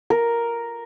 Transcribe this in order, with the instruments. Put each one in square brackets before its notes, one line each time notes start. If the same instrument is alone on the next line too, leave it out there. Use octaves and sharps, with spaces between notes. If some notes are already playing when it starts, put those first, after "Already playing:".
[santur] A#4